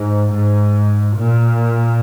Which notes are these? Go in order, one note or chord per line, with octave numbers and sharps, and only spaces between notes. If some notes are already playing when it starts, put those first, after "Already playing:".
Already playing: G#2
G#2
A#2